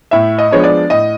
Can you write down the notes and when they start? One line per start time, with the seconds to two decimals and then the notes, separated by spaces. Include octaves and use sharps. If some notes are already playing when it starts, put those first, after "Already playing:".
0.11 A2 E5
0.39 D#5
0.51 F3 G#3 B3 D4 C#5
0.64 D5
0.90 A2 D#5